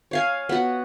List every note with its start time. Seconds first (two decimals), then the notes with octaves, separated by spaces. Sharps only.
0.11 C#5 F5 G#5
0.49 B3 F#4